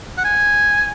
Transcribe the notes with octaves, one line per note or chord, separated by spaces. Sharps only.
F#5
G#5